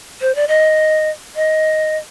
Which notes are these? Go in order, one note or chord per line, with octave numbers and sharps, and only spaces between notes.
C5
D5
D#5
D#5